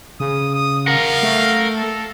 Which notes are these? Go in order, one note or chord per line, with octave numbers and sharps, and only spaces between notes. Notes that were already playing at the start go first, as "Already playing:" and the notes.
C#3 D#6
D#6
A#4 F5 F#5
A3
A4